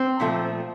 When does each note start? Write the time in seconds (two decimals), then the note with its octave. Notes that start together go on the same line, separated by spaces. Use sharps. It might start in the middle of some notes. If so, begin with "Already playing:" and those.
Already playing: C4
0.20 A#2 F3 A3